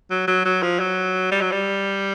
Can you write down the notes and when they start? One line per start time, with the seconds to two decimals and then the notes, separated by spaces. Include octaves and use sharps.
0.10 F#3
0.28 F#3
0.45 F#3
0.62 F3
0.80 F#3
1.31 G3
1.41 F#3
1.52 G3